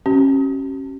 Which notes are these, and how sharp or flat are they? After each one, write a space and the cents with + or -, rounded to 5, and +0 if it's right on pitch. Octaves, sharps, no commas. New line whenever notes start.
C#4 -30 G4 -45